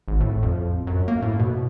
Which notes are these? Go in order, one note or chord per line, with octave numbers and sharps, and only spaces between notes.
G#1
A2
F2
F#2
A#3
A2
B2